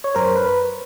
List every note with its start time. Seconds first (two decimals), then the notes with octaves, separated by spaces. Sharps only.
0.04 C#5
0.15 F#2 A#4 C5
0.36 B4